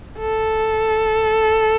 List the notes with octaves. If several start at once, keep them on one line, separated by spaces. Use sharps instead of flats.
A4